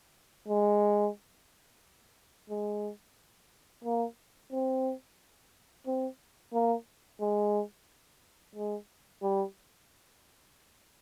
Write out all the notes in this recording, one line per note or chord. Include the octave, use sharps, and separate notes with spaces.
G#3
G#3
A#3
C4
C4
A#3
G#3
G#3
G3